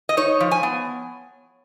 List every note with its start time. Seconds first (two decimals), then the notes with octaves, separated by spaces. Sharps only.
0.09 D#5
0.17 D#4 C#5
0.41 F3
0.51 G#5
0.63 B3